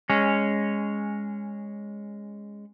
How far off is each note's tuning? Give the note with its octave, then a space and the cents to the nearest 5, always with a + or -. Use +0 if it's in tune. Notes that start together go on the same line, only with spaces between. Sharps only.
G#3 -10 C#4 +0